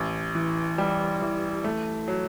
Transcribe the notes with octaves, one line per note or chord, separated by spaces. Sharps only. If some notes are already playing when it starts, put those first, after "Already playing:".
Already playing: A1
E3
G3
E3
A3
F#3